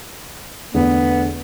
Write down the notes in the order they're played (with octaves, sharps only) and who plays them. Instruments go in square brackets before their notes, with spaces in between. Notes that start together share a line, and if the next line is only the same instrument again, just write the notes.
[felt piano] E2 D3 A3 [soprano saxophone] B3